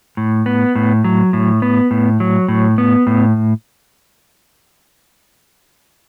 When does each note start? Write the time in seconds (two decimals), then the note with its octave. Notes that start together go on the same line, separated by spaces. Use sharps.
0.17 A2
0.46 B3
0.75 A2
1.04 F#3
1.33 A2
1.62 B3
1.91 A2
2.20 F#3
2.48 A2
2.78 B3
3.07 A2